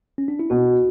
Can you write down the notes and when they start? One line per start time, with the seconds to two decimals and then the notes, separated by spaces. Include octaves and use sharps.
0.18 C#4
0.28 D4
0.39 E4
0.50 B2 F#4